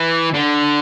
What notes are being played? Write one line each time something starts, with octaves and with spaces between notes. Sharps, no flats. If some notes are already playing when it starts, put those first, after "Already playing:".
Already playing: E3
D3